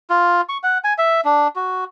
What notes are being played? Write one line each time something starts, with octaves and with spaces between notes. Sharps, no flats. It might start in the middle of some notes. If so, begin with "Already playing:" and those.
F4
C#6
F#5
G#5
E5
D4
F#4